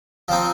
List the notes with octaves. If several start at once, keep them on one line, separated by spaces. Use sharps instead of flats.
F3 C4 D#4